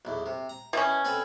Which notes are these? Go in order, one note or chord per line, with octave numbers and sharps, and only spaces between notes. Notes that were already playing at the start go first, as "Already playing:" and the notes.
B1 E2
C3
A#5
B2 C#4 E4
C4 A4 B4